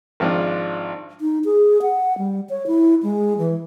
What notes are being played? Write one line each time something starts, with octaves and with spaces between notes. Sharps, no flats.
G#1 F3 D4
D#4
G#4
F#5
G3
C#5
E4
G#3
E3